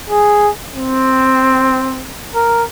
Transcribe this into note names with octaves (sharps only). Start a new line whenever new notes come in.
G#4
C4
A#4